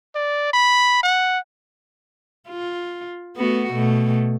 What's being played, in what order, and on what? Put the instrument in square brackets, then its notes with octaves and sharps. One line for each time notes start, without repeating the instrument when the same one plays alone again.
[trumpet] D5
B5
F#5
[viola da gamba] F4
A3 B3 F#4
B2 A3